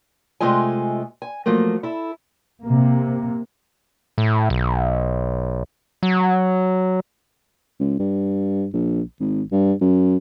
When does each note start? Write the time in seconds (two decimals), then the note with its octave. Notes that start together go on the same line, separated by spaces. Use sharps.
0.40 C3 G#3 A3 F4 D#5 G#5
1.22 G#5
1.46 F3 F#3 A3 A#3
1.83 E4 A4
2.63 C3 A#3
4.18 A2
4.50 B1
6.03 F#3
7.79 C#2
7.99 G2
8.73 A#1
9.20 G#1
9.52 G2
9.81 F#2